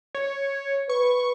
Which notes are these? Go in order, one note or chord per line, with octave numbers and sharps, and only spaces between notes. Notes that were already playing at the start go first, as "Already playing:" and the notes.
C#5
B4 C#6